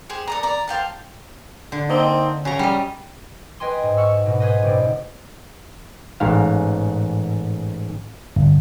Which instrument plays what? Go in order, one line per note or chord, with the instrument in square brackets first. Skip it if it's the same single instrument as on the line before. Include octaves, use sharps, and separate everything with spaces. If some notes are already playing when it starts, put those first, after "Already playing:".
[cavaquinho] G4 G#4 C5
A4 D5 A#5
D5 A#5
C5 F5 G5 A5
[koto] D3
[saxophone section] A#3 C4 D#4
[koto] C#3 A#5 [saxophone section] F#3 C#4
[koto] G3 D#5
[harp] B4 D#5 G5 G#5 C6
G#2
F#5 C#6 E6 F6
G#2 B2
G#4 B4 C5 D#5
F#1 B2 C4 D5
[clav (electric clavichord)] A1 G#2 F5
[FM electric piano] G1